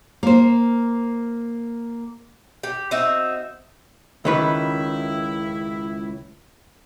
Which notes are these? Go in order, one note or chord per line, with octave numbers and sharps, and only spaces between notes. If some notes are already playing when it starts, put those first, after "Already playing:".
A#3 C5
G4
C4 D#4 F#4 E5
C#2 D#3 E4 B4